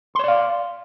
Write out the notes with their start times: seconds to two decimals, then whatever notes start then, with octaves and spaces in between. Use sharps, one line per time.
0.15 C6
0.19 C#5
0.24 D5
0.28 F5